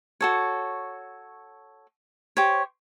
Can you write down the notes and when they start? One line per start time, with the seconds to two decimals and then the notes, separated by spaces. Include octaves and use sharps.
0.21 F#4 A4 C#5
2.37 G4 C5 C#5